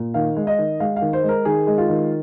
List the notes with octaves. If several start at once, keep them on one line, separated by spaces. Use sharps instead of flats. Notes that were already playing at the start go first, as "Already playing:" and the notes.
Already playing: A#2
D#3 F5
G#3
D#5
D#3
G#3 F5
F5
D#3
C5
G#3
A#4
D#3 G#4
G#3
F4
D#3